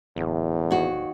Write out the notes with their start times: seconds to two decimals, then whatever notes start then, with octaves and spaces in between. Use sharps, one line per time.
0.17 D1 E2
0.71 D#2 F#4